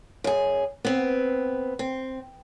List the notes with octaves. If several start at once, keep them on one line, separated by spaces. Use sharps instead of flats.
F#2 G#4
B3 C4
C4